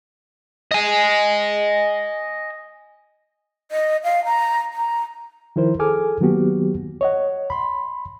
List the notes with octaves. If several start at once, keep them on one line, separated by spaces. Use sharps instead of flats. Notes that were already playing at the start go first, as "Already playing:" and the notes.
D#5 G#5
D#5
F5
A#5
A#5
D#3 F3 E4 A#4 C5
G#4 A4 G#5 D6 F6
D#3 F#3 A#3 B3 F#4 G4
C#5 D#5 F#5
B5 C6